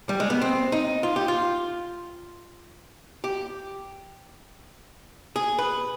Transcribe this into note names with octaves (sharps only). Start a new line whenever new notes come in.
G3
G#3
B3
C4
D#4
F4
G4
F4
G4
G#4
B4